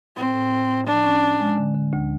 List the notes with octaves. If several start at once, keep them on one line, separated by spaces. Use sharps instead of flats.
A2 C4
A2
A2
A2
F3 D4
C#4
C#4
G#3
D3
D3
D2